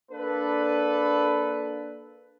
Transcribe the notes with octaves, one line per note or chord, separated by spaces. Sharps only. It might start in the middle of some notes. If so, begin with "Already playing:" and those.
A#3 D4 A4 B4